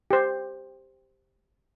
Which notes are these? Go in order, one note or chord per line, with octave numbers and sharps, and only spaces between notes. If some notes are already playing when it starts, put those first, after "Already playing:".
G4 C5